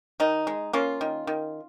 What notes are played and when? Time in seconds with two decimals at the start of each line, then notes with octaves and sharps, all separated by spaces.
0.20 D#3 D#4
0.47 G#3
0.73 A#3 C#4 F4
1.01 D#3
1.27 D#3